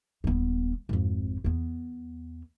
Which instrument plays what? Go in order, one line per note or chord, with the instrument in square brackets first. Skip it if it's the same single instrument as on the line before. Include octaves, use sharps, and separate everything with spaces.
[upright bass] D#1 B3
G#1 F2
E2 B3